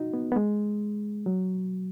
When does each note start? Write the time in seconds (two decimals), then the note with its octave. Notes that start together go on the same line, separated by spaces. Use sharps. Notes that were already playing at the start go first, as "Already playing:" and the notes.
Already playing: D#4 F#4
0.14 B3
0.32 B3
0.36 G#3
1.26 F#3